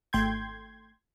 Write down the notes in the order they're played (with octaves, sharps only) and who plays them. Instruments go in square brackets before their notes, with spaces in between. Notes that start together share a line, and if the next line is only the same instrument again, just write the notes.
[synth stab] G#1 A3 G5 C6 G6 G#6